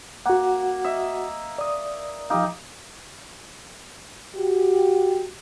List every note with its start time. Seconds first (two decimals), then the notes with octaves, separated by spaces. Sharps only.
0.26 A#3 F#4 F#5
0.84 D#5 E5
1.58 D5 D#6
2.30 F3 D#4 G4 F5
4.36 F#4 G4